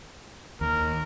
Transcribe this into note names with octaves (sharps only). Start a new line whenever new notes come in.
D#2 A#4